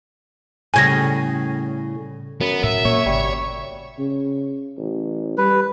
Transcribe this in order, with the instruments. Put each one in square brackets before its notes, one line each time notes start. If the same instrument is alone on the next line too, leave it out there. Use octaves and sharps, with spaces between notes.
[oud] A2 C#3 G3 [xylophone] G#5 G#6 A#6
[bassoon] F#2 [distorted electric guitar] B3
[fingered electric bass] A2 [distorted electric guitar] E5
[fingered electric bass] A#2 A#3 [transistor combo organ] C#5
[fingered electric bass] G#1 C#3 [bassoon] G3
[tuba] C#3
A1
[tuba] G3 [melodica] B4